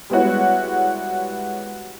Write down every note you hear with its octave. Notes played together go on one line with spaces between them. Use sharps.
G3 G#3 B3 E4 F#4 C#5